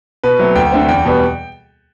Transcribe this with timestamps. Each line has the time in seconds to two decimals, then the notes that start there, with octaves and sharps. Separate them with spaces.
0.23 B2 B4
0.40 F#3 A3 C4
0.56 D2 G5
0.72 D3 A3 C4
0.88 E2 G5
1.05 B2 G3 B3